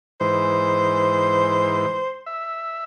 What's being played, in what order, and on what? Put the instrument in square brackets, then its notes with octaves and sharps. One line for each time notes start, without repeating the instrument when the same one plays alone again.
[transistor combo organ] G#2 E3 [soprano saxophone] C5
[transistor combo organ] E5